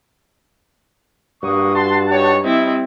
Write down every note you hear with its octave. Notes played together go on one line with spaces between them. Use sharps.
G2 A#3 F#4 C#6 D#6
F#4 A5 C6
D#4 G4 C#5
G3 C4 E4 D#5